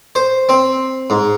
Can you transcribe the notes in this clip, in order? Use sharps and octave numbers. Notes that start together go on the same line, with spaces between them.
C5
C4
G#2